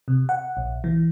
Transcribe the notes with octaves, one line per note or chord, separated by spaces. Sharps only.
C3
F#5
A#1
E3